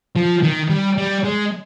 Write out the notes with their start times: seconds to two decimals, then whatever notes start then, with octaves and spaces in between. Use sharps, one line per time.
0.16 F3
0.43 D#3
0.70 G3
0.98 G3
1.25 G#3